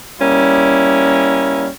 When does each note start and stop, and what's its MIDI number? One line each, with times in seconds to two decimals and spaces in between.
0.20 1.67 55
0.20 1.67 58
0.20 1.67 61
0.20 1.67 64